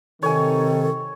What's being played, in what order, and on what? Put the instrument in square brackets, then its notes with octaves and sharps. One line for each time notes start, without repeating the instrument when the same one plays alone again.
[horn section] C3 D#3 [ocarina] A4 [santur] C#5 G#5